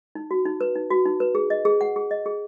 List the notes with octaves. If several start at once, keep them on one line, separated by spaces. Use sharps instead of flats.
D#4
F#4
D#4
B4
D#4
F#4
D#4
B4
G#4
D#5
G#4
F#5
G#4
D#5
G#4